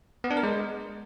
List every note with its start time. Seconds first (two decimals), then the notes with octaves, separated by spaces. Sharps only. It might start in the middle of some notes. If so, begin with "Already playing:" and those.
0.24 B3
0.31 D4
0.37 A#4
0.43 G#3